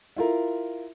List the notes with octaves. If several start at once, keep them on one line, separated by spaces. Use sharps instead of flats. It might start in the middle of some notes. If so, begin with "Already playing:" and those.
E4 F4 A#4